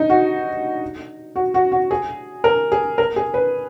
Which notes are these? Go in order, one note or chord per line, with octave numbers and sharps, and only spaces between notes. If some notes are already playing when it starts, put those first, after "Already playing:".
Already playing: D#4
F#4
F#4
F#4
F#4
G#4
A#4
G#4
A#4
G#4
B4